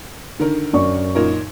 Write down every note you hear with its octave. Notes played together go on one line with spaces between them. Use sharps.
D3 D#3 A#4
F#2 D5 C#6
A#2 D#4 A#4